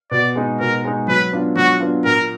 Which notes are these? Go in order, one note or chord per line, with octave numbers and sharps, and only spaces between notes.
B2 D5
G#3 D#4
B2 A#4
G#3 D#4
F#3 B4
B3 D4 F4
F#3 F#4
B3 D4 F4
A#2 A#4